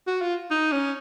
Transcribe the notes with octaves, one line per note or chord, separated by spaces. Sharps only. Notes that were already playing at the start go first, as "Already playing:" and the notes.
F#4
F4
D#4
C#4